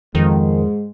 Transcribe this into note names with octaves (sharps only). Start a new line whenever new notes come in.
F2 G#2 D#3 G#3